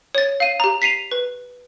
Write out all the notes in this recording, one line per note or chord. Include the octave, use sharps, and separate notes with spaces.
C#5 A6
F5 D#7
G4 A#5
B6 C7 D#7 F7
B4